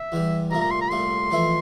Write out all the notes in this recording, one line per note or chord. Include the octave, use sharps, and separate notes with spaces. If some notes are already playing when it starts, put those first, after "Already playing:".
Already playing: E5
E2 E3 G3
C2 A#2 A3 A#5
A#5
C6
A#5
C2 A#2 A3 C6
F2 E3 A3 E4